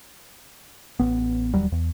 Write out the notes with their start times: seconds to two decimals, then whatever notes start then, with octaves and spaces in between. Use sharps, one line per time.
0.99 A1 B3
1.54 D1 D#2 F#3 G3
1.72 E2